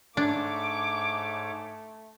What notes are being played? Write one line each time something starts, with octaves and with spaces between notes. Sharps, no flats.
G#2 A3 D4 C#5 D6